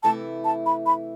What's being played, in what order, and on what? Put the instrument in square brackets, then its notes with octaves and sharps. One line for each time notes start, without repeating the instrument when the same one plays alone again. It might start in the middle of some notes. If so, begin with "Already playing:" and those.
[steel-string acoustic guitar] C3 E3 A3 E4 [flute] A5
[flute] A5
B5
B5